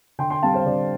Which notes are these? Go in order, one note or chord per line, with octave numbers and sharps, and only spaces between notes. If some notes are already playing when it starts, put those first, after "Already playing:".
D3 G5 C6
G5 C6
G3 C4 F5 A5
C5 F5
D3 D5